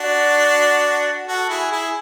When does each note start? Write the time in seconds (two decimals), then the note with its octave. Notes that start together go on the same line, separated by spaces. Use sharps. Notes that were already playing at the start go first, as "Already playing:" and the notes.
Already playing: D4 F#4
1.27 F#4 A4
1.49 E4 G#4
1.72 E4 G#4